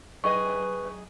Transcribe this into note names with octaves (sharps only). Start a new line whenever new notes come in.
F#2 G#4 B4 D#5 C#6